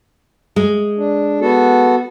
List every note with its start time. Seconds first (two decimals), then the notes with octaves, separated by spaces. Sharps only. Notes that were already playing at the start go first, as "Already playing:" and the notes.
0.56 G#3
0.97 D4
1.41 B3 F#4 A4